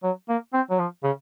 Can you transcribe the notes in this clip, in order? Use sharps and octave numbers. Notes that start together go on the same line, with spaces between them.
F#3
A#3
C4
F#3
F3
C#3